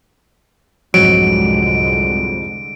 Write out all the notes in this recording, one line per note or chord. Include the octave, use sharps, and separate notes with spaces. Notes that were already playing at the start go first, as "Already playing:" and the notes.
C2 F2 G#2 D3 F#3 G#3 D7